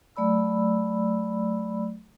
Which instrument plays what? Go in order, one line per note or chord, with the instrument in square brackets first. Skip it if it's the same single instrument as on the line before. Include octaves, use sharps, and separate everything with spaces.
[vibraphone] F#3 A3 D5 B5 E6